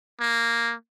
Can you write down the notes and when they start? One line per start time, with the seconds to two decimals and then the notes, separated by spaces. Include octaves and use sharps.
0.20 A#3